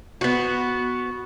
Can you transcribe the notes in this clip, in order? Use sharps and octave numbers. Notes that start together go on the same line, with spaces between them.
B3 F#4